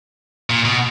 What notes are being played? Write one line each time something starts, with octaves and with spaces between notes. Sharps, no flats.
A#2
B2